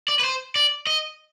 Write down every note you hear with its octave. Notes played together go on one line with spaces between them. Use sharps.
D5
B4
C5
D5
D#5